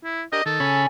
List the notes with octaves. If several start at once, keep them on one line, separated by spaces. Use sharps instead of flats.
E4
D4 G4 A#4 D#5
D#3 A4
C#3 C#4 G#5 B5